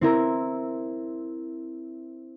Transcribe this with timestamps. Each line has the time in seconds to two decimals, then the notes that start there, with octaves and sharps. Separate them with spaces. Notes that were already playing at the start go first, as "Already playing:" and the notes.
0.01 C4 E4 A#4